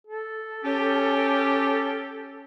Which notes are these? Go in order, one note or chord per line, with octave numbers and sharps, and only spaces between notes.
A4
C#4 G4